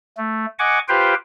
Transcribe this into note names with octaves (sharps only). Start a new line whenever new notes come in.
A3
D#5 F#5 G#5 C#6 D6
F4 G4 B4 C5 F5 G5